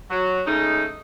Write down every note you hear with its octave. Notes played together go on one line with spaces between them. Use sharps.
F#3
C#3 G#3 A3 D#4